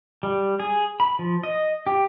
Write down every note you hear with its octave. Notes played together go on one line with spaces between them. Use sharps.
G3
G#4
B5
F3
D#5
G4